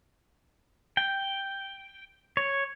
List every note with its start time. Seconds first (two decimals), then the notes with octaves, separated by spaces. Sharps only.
0.97 G5
2.37 C#5